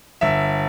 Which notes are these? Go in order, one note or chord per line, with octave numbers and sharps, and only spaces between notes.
G1 E5